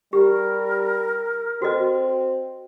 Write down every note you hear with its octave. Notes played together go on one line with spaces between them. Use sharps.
G3 G4 A#4
C4 F#4 A4 D#5